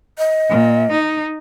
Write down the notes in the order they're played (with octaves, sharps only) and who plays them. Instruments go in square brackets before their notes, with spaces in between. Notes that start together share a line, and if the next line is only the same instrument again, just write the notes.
[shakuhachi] D#5
[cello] A#2
D#4